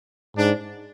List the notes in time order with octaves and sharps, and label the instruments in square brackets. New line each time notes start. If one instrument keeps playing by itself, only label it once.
[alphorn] G#2 [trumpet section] D4